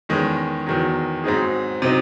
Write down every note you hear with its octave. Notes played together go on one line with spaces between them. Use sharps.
E2 D#3 G#3 C#4
E2 D#3 F#3
G#2 F#3 C4 D#4 G#4
C3 F#3 C4 D#4